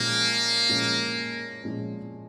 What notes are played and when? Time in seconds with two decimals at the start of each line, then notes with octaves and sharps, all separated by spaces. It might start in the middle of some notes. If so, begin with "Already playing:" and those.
Already playing: A#2 F3 G#3 A#3 C#4
0.69 A#2 F3 G#3 C#4
1.63 A#2 F3 G#3 C#4